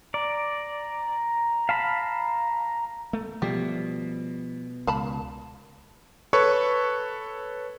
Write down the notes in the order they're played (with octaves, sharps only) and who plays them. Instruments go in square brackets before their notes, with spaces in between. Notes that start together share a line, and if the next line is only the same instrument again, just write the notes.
[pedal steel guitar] D5 [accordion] A#5
[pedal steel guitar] F5 A5 B5
[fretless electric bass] A3
[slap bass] B2 [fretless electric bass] F3 G3 A3 [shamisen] G4
[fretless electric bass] C#2 [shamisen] F5 A5 B5
[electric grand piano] A4 B4 C#5 C#6